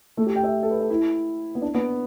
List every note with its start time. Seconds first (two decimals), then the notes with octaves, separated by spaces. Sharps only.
0.17 A3
0.27 G4
0.36 G5
0.44 E5
0.63 A4
0.71 B4
0.81 A4
0.90 E4
1.55 B3
1.62 D4
1.74 B3